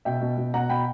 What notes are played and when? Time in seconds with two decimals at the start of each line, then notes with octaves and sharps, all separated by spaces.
0.05 B2 E5 G5
0.21 B2
0.38 B2
0.54 B2 F#5 A#5
0.70 B2 G5 B5